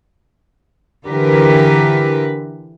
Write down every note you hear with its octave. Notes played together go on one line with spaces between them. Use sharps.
D3 E3 G4 A#4 B4